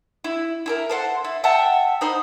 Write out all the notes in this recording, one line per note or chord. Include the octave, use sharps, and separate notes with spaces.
E4
E4 A4 A#4
A4 C5 F#5
E4
E5 F#5 G5 A5
D#4 C5 B5